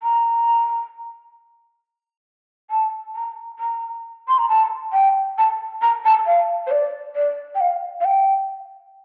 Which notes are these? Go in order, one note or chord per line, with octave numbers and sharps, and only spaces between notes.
A#5
A5
A#5
A#5
C6
A#5
A5
G5
A5
A#5
A5
F5
C5
D5
D5
G5
F5
F5
G5